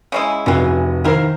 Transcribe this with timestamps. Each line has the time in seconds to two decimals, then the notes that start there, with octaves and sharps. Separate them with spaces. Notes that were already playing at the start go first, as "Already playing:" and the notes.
0.12 C#3 G#3 E4
0.46 F1 C#3 E3 F#4
1.04 D#3 E4 A#4 C5 F5